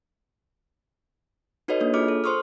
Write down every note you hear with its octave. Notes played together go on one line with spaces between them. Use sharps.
D#4 F#4 A4 B4 C#5 D#5
A#3 D4 C#5
F4 G#4 D6 F6
A4
C5 C6 C#6 D#6 F6